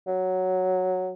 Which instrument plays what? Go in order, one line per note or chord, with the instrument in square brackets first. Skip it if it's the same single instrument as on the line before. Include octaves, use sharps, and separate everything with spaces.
[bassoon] F#3